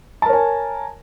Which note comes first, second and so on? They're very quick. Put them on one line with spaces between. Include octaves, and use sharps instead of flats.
A5 A#4 C#5 G#5